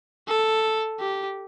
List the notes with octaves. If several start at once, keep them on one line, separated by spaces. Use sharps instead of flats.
A4
G4